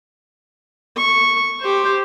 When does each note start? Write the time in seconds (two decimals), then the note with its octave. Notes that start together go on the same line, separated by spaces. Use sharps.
0.97 C#6
1.61 G4 C5